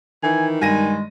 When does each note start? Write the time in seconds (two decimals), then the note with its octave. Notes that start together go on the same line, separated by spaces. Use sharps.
0.23 D#3 E3 G#5
0.61 G2 G#3 G#5 A#6 D#7